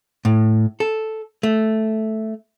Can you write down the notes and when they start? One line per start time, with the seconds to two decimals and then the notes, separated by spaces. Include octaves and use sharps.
0.25 A2
0.80 A4
1.43 A3